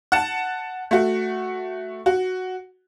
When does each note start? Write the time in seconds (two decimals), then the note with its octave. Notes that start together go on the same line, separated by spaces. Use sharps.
0.12 F#5 A5
0.91 A3 F#4
2.06 F#4